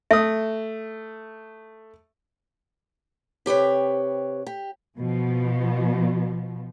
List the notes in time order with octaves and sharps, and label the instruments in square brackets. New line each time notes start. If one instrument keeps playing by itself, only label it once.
[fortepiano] A3 D#6 [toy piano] E5
[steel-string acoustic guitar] C3 G4 B4 C#5
G4
[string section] B2 F3